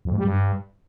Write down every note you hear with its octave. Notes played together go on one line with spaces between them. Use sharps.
F2
G#2
G3
G2